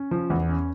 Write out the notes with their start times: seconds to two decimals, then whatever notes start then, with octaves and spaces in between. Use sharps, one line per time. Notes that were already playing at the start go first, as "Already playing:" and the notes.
Already playing: C#4
0.11 F3
0.30 E2
0.49 C#4